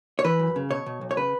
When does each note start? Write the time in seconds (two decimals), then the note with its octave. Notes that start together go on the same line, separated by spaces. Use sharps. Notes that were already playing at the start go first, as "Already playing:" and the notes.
0.19 C#5
0.24 E3 B4
0.39 F#2
0.56 C#3
0.71 B2 C#5
0.86 B2
1.01 B1
1.11 C#5
1.17 C#3 B4